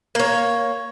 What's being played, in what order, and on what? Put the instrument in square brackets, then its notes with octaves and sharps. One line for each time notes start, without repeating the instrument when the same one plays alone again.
[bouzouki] A#3 C#5